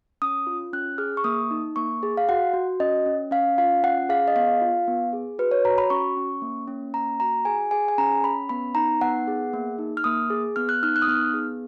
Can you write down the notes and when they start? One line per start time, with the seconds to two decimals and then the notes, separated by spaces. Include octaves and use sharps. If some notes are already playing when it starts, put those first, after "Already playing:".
0.22 C#4 D#6
0.47 F4
0.73 C#4 F#6
0.98 G#4 F6
1.17 C#6
1.24 A#3 D#6
1.51 D#4
1.76 A#3 C#6
2.03 G#4
2.17 F5
2.29 F#4 F#5
2.53 F#4
2.80 C#4 D#5
3.06 C#4
3.31 C#4 F5
3.58 F4 F5
3.83 C#4 F#5
4.09 G#4 F5
4.28 D#5
4.36 B3 F5
4.61 F4
4.88 B3
5.13 G#4
5.39 F#4 B4
5.51 C#5
5.64 F#4 A#5
5.78 B5
5.90 C#4 C#6
6.17 C#4
6.42 A#3
6.68 C#4
6.94 A#3 A#5
7.20 F#4 A#5
7.45 G#4 G#5
7.71 G#4 G#5
7.88 G#5
7.98 C#4 A#5
8.23 C#4 B5
8.49 B3 B5
8.75 D#4 A#5
9.01 B3 F#5
9.28 G#4
9.53 A#3
9.78 D#4
9.97 F6
10.04 A#3 D#6
10.30 G#4
10.56 B3 F6
10.69 F#6
10.83 D#4 F6
10.96 F#6
11.02 D#6
11.08 B3 F6
11.34 G#4